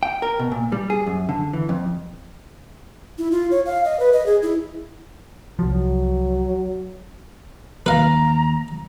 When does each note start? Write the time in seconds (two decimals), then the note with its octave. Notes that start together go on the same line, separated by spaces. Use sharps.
0.03 G5
0.22 A#4
0.39 B2
0.52 A#2
0.72 G3
0.90 G#4
1.07 F#2
1.29 D3
1.53 E3
1.69 F2
3.18 E4
3.31 F4
3.51 C#5
3.66 F5
3.85 D#5
4.00 B4
4.12 D#5
4.26 G#4
4.43 E4
5.59 C2 F3 F#3
7.86 D#2 B4 F5 A#5